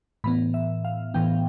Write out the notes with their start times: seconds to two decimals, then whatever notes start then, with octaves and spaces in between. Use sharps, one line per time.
0.24 A2 E3 B3 B5
0.54 E5
0.85 F5
1.14 A2 E3 B3 G5